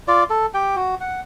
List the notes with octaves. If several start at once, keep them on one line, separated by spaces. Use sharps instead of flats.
F4 D5
A4
G4 G5
F#4
F#5